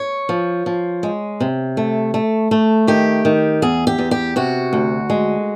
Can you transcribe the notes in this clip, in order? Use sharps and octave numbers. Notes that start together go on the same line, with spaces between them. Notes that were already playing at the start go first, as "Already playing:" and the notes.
Already playing: C#5
F3
F3
G#3
C3
A3
A3
A3
D#3 G4
D#3
E2 G#4
G4
E2
G4
C3 F#4
D2
G#3